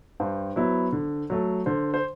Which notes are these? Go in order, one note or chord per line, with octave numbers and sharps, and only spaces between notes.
G2 C5
F#3 B3 E4
D3
F#3 A3
D3 C5
C5